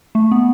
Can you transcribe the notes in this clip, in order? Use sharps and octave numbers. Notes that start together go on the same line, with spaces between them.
A3
B3